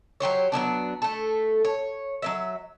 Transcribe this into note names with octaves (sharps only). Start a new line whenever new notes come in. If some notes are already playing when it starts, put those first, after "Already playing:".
F#3 G4 C5 C#5
F#3 G3 B3 D4
A3 A4
C#5
F#3 A#3 E5